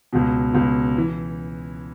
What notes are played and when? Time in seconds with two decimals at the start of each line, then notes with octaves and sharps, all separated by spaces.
0.13 C#2 B2
0.53 C#2 B2
0.98 E3